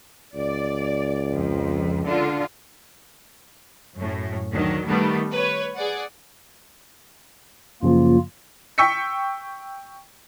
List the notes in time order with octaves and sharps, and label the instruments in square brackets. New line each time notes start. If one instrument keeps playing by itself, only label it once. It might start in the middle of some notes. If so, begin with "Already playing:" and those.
[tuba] C#2 [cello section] D5
[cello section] F2
D3 F4
[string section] F#2 A2
D2 D#3 F#3
D#3 G3 A3 B3
B4 C#5
G#4 D5 F#5
[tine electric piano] F#2 C#3 F3 [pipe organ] A#3 F4
[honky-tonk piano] G5 C#6 E6 B6 C#7